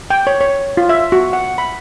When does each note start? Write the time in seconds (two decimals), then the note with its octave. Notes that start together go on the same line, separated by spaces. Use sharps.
0.10 G5
0.27 C#5
0.41 C#5
0.77 F4
0.89 E5
1.12 F#4
1.33 F#5
1.58 B5